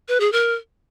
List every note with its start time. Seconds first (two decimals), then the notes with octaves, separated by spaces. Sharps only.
0.08 B4
0.20 G#4
0.32 A#4